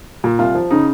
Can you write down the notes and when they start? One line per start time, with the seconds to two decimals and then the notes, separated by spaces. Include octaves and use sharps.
0.24 A#2
0.39 C2 F4
0.55 F3
0.71 C#3 D#4